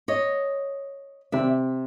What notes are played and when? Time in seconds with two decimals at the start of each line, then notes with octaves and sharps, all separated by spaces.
0.08 C#5 D#5
1.32 C3 D5 E5